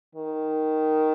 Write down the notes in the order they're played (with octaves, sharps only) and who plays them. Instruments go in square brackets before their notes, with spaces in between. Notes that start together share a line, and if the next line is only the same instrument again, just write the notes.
[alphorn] D#3